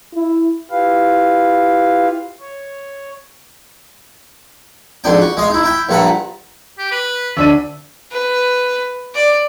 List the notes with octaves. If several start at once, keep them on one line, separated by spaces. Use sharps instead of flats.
E4
E4 F4 G4 B4 F5
C#5
F2 G#2 D4 G5
F#4
G#3 D#5 F5
D#4 E4
E4 G5 B5
A#1 G2 A4 F#5 A#5 B5
G4
B4
D2 D4 E5 D#7
B4
D5